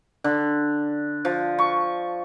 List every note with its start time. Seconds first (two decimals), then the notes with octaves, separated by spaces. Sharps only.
0.24 D3
1.25 F3
1.59 C#6